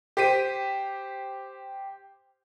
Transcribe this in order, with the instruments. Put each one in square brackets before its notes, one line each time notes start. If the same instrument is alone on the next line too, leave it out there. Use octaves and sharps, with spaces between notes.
[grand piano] G4 C5 B6 D#7